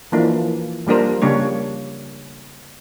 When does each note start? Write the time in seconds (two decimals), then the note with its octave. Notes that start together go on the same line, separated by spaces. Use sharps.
0.12 E3 F3 A#3 D4
0.87 F3 G3 A#3 D4 A#4 C5
1.22 C#3 G3 A#3 D4 C#5